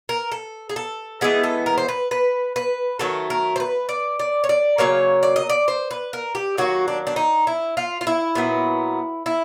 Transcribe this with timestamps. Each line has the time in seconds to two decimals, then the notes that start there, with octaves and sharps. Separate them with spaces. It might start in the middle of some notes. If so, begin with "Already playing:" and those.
0.09 A#4
0.32 A4
0.70 G#4
0.76 A4
1.21 E3 G#3 B3 G#4
1.44 A4
1.66 A#4
1.78 C5
1.89 B4
2.11 B4
2.56 B4
2.99 D#3 F#3 A3 A4
3.30 A#4
3.56 C5
3.60 B4
3.89 D5
4.20 D5
4.44 C#5
4.49 D5
4.78 C#3 F#3 A#3 C#5
5.23 D5
5.36 D#5
5.49 D5
5.68 C5
5.91 B4
6.13 A#4
6.35 G4
6.58 D#3 F#3 A#3 F#4
6.88 D4
7.07 D4
7.16 D#4
7.47 E4
7.77 F4
8.01 F4
8.07 E4
8.35 A#2 F#3 B3
9.26 E4